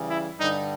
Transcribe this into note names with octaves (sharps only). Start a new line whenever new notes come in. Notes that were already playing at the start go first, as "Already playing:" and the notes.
Already playing: C#3 E3 G3
E4
G2 D3 G3 D#4